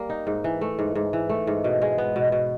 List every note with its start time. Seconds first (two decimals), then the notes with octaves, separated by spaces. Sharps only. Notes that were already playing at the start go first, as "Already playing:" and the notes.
Already playing: G3 A#3
0.10 D#4
0.27 G#2
0.44 E3
0.61 A3
0.79 G#2
0.95 G#2
1.13 E3
1.29 A3
1.47 G#2
1.64 B2
1.82 G#3
1.98 B3
2.16 B2
2.32 B2